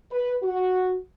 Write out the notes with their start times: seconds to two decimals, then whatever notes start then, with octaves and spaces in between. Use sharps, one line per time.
0.11 B4
0.43 F#4